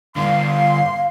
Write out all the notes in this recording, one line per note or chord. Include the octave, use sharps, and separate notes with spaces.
G2 D3 F5 C6